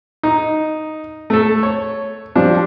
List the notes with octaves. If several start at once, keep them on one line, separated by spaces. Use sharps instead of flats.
D#4
A3 A4
C#5
F3 G3 D4